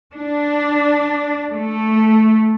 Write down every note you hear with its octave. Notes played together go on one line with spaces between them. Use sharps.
D4
A3